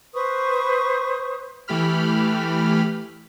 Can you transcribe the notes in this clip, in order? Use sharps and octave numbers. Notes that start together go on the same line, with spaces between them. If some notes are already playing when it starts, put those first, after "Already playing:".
B4 C5 C#6 D#6
E3 A3 G4 B5 F6